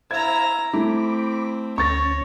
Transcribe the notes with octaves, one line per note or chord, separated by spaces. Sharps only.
E4 C5 E5 F5 A#5 G#6
A3 C4 E4 B5 D6
D2 C#4 C#5 C#6 A6 A#6